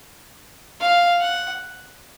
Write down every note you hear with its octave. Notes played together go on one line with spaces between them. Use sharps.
F5
F#5